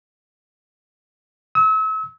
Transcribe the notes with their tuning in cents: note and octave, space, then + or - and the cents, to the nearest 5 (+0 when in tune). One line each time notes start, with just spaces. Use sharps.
E6 -35